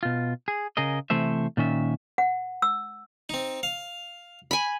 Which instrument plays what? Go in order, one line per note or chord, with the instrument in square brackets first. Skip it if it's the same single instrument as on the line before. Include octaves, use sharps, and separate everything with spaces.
[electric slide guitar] B2 F4
G#4
C#3 G#4 A#4 D#5
C3 E3 A3 C5 E5
A#2 D#3 C#4 E5
[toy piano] F#5
E6
[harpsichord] C4 D#4
F5
[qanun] G#5 B5